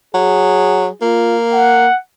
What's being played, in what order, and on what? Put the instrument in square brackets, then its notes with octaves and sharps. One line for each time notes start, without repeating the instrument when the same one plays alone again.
[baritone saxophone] F#3 [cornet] G#4
[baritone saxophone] A#3 [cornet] F4
[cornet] F#5